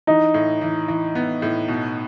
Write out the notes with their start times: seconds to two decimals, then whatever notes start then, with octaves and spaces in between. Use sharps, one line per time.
0.07 E3 D#4
0.34 A2
0.61 E3
0.88 E3
1.15 B3
1.42 A2
1.68 B2